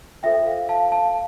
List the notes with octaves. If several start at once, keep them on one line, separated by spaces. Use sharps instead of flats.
F4 A4 C5 E5 G5
F5
F5 A5
F5 A5